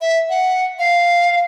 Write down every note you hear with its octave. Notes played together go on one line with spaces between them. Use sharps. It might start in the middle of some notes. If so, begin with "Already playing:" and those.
E5
F#5
F5